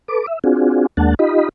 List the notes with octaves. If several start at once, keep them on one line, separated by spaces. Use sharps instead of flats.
A4 B4 D6
E5
C4 D4 F4 F#4 G#4
D#2 G#3 A#3 D4 F#5 A5
D#4 F4 G4 D#5 B5